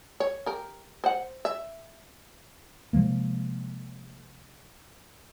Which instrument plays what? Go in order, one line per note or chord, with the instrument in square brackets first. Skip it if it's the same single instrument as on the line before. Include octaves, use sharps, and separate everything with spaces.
[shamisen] C#5
G4 A#4
C5 F#5
E5
[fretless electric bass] C3 F3 G#3 A#3